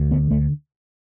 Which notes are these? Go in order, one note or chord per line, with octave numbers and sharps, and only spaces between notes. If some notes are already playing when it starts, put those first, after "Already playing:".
Already playing: D2
D3 B3
D2 A3